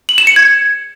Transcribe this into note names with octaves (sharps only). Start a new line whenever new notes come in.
F#7
E7
C#7
G#6